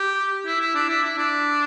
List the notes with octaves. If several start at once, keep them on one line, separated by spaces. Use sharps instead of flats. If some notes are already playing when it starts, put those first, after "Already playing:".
Already playing: G4
E4
E4
D4
E4
E4
D4